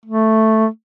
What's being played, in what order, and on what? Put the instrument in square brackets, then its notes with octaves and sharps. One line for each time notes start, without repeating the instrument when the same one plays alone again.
[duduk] A3